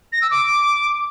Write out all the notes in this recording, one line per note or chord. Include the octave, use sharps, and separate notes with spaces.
A#6
E6
D6